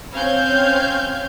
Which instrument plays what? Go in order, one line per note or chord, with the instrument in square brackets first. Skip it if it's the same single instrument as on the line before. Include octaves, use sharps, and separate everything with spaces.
[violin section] C4 C#4 F5 F6 G6 G#6